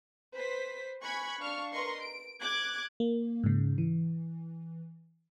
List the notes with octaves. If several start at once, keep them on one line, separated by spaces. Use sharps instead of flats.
B4 C5 B6
G#5 B5 C#6 F#6 G#6
D4 F5 C#6 F6
A#4 B4 D#5 C6 C#6
D7
D6 F#6 G#6
A#3
G#2 C#3
E3